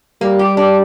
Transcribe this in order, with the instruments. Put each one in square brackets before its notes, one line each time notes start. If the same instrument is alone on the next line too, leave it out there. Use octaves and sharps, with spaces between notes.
[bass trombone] G3 [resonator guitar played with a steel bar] A#3
[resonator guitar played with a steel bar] G4
D4